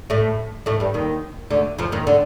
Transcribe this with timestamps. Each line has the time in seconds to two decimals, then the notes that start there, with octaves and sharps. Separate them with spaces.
0.10 A2 A3
0.66 A2 A3
0.80 G2 G3
0.94 D#2 D#3
1.50 D2 D3
1.79 F2 F3
1.92 D#2 D#3
2.07 D3